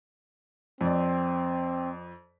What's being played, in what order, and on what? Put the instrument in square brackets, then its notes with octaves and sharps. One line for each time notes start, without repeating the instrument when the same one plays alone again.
[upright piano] F2 D5 [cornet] C4